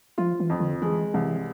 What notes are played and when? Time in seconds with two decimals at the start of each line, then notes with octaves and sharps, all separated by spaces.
0.18 F3 F4
0.40 E3
0.50 F2
0.60 D3
0.82 E3 G#3
1.14 C2 E3